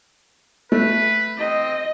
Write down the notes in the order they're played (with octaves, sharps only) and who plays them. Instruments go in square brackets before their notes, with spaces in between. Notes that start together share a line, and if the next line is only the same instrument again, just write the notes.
[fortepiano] A3 [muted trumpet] B4
[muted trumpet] C4 [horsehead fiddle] D#5